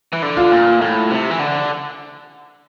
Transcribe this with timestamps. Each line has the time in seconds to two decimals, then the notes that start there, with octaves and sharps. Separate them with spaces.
0.13 E3
0.23 D3
0.37 F4
0.51 A#2
0.81 A2
1.10 C3
1.30 E3
1.39 D3